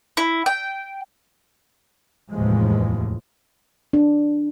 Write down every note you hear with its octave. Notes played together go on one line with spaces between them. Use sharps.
E4
G5
F1 D#2 A2 E3 F3 G#3
D4